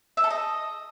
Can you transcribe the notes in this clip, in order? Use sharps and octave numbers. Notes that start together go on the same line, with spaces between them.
E5
A4
D#5